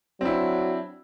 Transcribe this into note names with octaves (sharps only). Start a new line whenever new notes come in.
F#3 C4 D4 E4